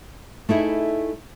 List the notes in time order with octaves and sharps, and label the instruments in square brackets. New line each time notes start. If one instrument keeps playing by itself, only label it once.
[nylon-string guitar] A3 D#4 E4 G#4